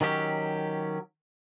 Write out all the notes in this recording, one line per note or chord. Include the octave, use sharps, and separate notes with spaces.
D#3 F#3 C#4 G4